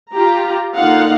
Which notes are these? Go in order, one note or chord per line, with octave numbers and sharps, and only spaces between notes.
F4 G4 A#5
D3 A#3 D#4 F4 F5 F#5